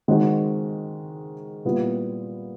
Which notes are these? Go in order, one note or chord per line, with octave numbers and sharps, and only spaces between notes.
D#3 G#3 C4 D#4 F#4
A#2 G3 B3 E4